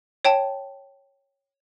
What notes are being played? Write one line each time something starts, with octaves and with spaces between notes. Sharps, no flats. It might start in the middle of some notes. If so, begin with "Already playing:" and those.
C#5 G5 A5